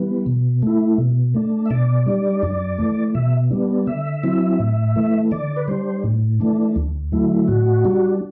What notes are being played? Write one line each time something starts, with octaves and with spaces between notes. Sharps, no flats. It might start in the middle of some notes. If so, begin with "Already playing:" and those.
Already playing: E3 G3 B3
B2
A3 E4
B2
A3 D4
E5
B2 D5
G3 D4 D5
F#2
E3 A3
B2 E5
G3 B3 D4
D3 E5
F#3 C4 E4
A2
E3 A3
D3 D5
B4
G3 D4 C5
A2
E3 A3 D4
D2
D3 F#3 A3 E4
A2 F#4
G3 D4